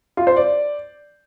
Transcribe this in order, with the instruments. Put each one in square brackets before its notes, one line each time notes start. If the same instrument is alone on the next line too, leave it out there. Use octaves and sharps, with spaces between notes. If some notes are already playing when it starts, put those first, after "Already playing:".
[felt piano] F4
C5
D5